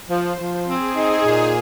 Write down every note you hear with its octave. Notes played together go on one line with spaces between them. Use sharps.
F3
C5
F3
C4 G#4
D#4
A#2